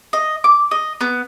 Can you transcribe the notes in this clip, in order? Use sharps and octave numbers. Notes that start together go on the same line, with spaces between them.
D#5
D6
D#5
B3